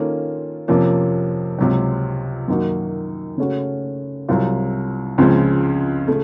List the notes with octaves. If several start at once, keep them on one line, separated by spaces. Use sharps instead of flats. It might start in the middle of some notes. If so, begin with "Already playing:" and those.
Already playing: D#3 A#3 C#4 F4 A4
F2 C3 F3 A#3 C#4
C#2 C3 F#3
F#2 D#3 A#3 D#4 F#4
C#3 A3 C#4 F#4
C2 C3 F#3 C4 F4
C#2 C#3 F3 C4
C#3 A3